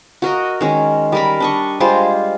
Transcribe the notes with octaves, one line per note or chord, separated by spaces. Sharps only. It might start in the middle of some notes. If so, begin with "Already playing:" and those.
F#4 A#4 D#5
D#3 G#3 C#4
G3 A#4 B5
D4 D#5 C#6
G3 G#3 F4 C5